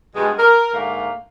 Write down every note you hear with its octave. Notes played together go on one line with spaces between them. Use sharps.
G2 B2 G#3
A#4
G#2 D3 A3 A#3 F5